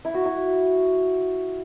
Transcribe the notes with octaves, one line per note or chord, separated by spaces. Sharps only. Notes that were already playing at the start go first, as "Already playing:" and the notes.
E4
F#4
E4